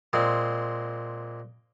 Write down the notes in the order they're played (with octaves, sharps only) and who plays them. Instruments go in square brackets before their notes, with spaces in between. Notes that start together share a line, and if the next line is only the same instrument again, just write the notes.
[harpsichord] A#2 G#3 C4